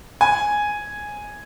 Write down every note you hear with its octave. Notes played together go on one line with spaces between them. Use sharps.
G#5